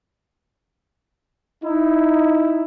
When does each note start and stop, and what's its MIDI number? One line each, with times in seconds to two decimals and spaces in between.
1.64 2.64 63
1.64 2.64 64